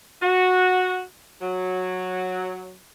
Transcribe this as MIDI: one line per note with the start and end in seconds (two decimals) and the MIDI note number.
0.22 1.02 66
1.42 2.77 54